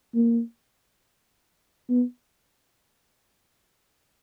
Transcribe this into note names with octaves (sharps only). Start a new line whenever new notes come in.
A#3
B3